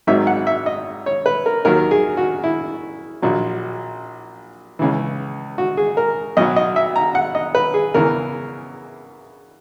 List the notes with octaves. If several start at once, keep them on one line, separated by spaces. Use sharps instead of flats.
G#1 G#2 D#3 F#3 E5
F#5
E5
D#5
C#5
B4
A#4
D#2 D#3 F#3 A#4
G#4
F#4
E4
A#1 A#2 F#3
C#2 C#3 E3
F#4
G#4
A#4
B1 B2 F#3 D#5
D#5
E5
A#5
F#5
D#5
B4
G#4
E2 C#3 E3 A#4